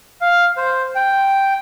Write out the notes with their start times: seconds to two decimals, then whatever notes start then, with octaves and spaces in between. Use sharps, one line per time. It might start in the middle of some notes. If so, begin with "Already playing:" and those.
0.21 F5
0.57 C5
0.95 G5